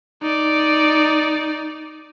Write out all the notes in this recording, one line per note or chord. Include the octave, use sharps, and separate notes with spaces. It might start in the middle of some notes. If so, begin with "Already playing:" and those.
D#4 D5